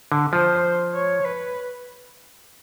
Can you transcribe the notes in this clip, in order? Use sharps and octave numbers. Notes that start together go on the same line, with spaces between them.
D3
F3 C5
C#5
B4